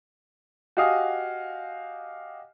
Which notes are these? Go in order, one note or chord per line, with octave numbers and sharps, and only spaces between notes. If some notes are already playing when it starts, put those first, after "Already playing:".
F#4 G4 D#5 F5 G#5 D#6